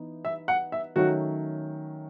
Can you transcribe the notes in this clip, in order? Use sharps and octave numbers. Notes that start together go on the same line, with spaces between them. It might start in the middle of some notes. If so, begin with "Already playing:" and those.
Already playing: E3 B3 D#4
E5
F#5
E5
D#3 F#3 A3 C#4 F#4